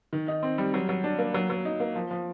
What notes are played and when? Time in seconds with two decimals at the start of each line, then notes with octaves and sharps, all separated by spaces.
0.13 D#3
0.28 D#4
0.43 C4
0.58 G3
0.74 F#3
0.89 F#3
1.04 D4
1.19 A#3
1.34 F#3
1.50 F#3
1.65 D#4
1.80 A#3
1.95 F3
2.11 F3